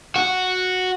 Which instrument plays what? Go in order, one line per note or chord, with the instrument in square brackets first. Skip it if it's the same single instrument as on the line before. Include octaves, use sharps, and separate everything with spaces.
[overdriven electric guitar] F#4